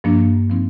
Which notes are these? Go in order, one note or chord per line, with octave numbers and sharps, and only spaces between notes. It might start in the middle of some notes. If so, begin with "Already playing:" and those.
G2 F3 A#3 D4
F3 C4 D#4